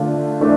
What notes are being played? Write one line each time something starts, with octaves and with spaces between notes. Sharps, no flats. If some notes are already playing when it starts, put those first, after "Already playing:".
Already playing: D3 A3 D4 F4
E3 A3 D4